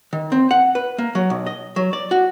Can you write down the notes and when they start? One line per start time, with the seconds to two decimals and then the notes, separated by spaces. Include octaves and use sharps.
0.13 D#3
0.32 C4
0.51 F#5
0.75 B4
0.98 A#3
1.15 F#3
1.30 B1
1.46 D#5
1.76 F#3
1.93 D5
2.11 F#4